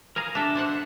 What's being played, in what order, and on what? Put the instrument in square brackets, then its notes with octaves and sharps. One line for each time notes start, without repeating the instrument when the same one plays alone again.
[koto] G#4 F5 [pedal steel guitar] A#4 A#5
[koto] D4 A4 [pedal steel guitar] E5
[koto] D4 C5 F#5